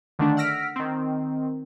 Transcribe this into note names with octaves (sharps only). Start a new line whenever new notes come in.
D3 D#3 A3 D4
F#5 E6 F6 A#6 B6 D7
D#3 C4